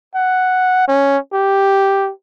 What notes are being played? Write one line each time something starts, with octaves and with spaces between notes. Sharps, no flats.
F#5
C#4
G4